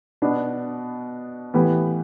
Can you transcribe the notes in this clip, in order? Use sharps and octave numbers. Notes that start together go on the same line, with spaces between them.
B2 B3 D4
A2 E3 B3 G4 B4